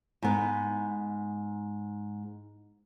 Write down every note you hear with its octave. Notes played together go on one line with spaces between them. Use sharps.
G#2 B3